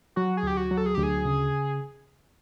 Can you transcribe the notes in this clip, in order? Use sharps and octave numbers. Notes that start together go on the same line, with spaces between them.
F#3 F#4
G#4
D2 G4
F#4
F#3
A4
G#4
D2 G4
G#4
C#3